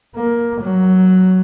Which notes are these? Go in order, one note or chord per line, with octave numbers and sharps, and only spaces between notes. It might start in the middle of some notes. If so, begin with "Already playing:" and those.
A#3
F#3